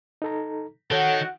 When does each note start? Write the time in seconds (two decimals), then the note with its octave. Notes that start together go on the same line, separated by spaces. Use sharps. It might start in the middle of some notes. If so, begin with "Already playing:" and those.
0.22 D#4 A4 A#5
0.91 D#3 F#4 A4 C#5 F#5